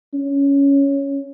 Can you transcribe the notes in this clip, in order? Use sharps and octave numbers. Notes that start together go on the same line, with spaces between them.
C#4